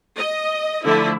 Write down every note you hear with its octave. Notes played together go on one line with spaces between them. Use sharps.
D#5
D3 F3 A3 E4